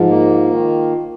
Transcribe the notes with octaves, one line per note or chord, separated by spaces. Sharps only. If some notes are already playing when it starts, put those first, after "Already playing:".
Already playing: G#2 F3
A#3
D#3